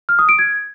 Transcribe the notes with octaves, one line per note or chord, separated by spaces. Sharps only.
F6
D#6
D7
G#6